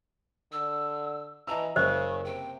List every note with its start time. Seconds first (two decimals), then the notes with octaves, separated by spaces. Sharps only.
0.52 D3 E6
1.47 E3 D#5 A5 A#5 E6
1.76 F#1 C#3 C5 D#5 C#6
2.24 C3 G5